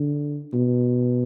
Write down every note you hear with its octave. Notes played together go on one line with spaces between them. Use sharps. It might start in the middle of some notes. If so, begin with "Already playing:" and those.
Already playing: D3
B2